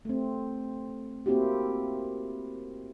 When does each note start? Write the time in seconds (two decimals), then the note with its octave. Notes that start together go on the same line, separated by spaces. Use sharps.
0.05 A3 C4
1.26 A#3 C4 E4 F#4 G4